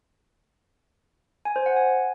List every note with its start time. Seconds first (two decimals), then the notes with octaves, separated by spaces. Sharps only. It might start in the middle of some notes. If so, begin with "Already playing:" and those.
1.45 G#5
1.56 C5
1.66 F#5
1.76 G#5